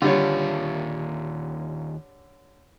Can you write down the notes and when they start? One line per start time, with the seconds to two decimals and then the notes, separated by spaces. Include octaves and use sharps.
0.02 D#2 D3 G3 F4 C#5